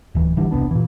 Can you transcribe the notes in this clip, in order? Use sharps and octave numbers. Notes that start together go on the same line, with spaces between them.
D1 E3
G#1 D3 E3 G3
E1 C2 B3 D4
A#2 E3